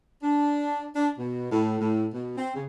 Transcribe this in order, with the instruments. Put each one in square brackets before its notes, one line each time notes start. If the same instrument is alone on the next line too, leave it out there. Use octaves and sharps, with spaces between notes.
[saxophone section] D4
D4
B2
A2
A2
B2
C4
C#3